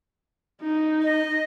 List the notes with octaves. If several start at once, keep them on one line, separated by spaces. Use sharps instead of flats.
D#4
D#5